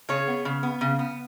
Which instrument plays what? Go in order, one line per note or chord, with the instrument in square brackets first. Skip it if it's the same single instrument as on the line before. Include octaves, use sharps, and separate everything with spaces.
[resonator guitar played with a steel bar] C#3 G#4 C#5
B3
C#3
B3
C#3
B3